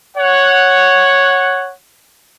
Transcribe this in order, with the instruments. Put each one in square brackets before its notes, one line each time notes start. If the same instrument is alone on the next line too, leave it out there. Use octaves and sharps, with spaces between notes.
[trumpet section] C#5 F#5